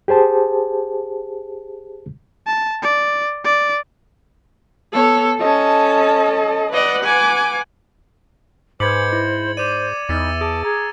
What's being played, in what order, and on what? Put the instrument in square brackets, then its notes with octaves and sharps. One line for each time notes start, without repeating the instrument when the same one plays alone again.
[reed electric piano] G4 G#4 C5 A5
[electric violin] A5
D5
D5
[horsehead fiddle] B3 C#5 [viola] A4
[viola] C#4 A5 [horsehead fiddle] A4 D#5
[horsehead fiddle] B4 F#5 [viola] D5 D#5
[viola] G#5 D6
[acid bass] G#2 [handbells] B4 B5 D6 [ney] C5 [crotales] G#6 C#7 F#7
[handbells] E4
[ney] C5 [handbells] D5 [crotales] D6 D#7
[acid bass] E2 [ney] D#4 [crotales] E6 A6
[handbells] G#4 D6 [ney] A5
[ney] G#4 [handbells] A#5